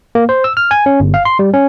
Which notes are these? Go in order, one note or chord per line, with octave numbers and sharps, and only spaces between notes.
A#3
C5
E6
F6
G#5
C#4
G1
F5
C6
G3
C#4